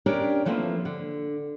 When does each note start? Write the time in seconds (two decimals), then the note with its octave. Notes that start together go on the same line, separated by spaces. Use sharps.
0.06 C#4 D4 G4 A#4 C#5 D5
0.45 E3 F3 A3 A#3 C4
0.85 D3